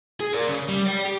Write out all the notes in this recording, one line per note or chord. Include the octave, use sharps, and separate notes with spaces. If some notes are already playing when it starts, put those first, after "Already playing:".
G#4
A#4 D5
C#3
G3
D5 G5
G4